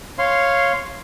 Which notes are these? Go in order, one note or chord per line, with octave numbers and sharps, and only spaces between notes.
C#5 F5 C6